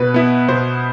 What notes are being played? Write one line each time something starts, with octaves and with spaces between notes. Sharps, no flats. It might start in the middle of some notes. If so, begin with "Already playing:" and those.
Already playing: B2 B4
B3 E4
B2 C5